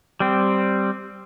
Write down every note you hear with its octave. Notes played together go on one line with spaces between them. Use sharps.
G3 C4